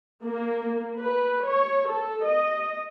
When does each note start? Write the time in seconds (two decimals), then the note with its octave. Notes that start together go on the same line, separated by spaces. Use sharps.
0.25 A#3
0.99 B4
1.44 C#5
1.88 A4
2.24 D#5